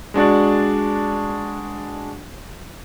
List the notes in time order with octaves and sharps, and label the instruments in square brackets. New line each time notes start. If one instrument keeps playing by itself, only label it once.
[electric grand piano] G#3 D4 F#4 D5